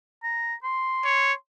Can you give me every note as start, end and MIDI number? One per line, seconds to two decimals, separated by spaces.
0.23 0.54 82
0.63 1.34 84
1.04 1.33 73